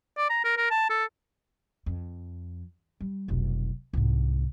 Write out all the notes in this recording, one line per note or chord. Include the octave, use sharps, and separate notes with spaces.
D5
A#5
A#4
A#4
A5
A4
F2
G3
F1 B1
C2 G#2